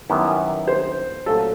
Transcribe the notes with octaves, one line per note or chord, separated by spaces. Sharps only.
F#2 D#3 G3 B3 E4
C5
A#2 F#3 A3 C#4 F4 A4